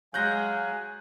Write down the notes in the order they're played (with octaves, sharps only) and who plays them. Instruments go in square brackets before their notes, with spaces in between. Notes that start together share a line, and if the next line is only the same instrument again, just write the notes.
[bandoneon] F#3 [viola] G#3 [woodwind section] F5 G#5 [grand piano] F#6 G6 A#6